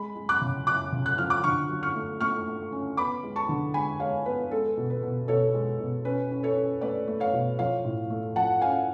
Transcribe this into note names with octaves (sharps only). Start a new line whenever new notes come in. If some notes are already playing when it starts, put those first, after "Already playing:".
Already playing: G#3 B5
G#3
D6 F#6
C#3
F#2 D6 F#6
C#3
F#6
F3 F6
D6 F#6
D3 C#6 F6
F#3
C#6 F6
A3
A3 C#6 F6
A3
C#4
B3 B5 D6
G#3
A5 C#6
D3
G#3 G#5 B5
G#3 C#5 F5
B3 B4
G#3 A4
B2
B4
B2
B2 A4 C#5
G#3
B2
C#4 B4
C#4
A4 C#5
C#4
A3 B4 D5
A3
C#5 F5
B2
F3 C#5 F5
A2
A3
F3 F#5 A5
C#4 F5 G#5